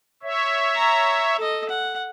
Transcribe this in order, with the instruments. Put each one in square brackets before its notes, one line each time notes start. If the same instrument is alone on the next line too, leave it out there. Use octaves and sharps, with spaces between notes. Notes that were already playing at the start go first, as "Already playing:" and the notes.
[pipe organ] C#5 E5
[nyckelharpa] A#5
A4 D#5
F#5